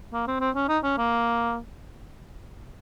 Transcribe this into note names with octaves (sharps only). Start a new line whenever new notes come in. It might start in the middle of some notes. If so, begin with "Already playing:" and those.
A#3
C4
C4
C#4
D#4
C#4
A#3